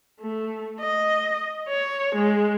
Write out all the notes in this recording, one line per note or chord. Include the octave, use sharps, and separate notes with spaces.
A3
D#5
C#5
G#3